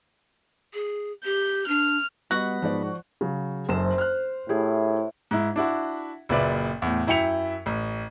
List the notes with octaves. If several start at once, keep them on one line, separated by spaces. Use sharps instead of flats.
G#4
G4 G6
D4 F6
G3 B3 F#4 D#5 F#6
G#2 F3 D5
C#3 F#3
F#1 F#2 C5 E7
F6 F#6
A2 E4 G4 G#4
G#2 E4
D4 E4 F#4
F#1 A#2 B4 D5 E5
E2 A2
F#2 E4 E5 G5 C#7 F7
A1